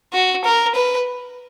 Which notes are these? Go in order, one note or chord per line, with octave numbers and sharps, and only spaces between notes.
F#4
A#4
B4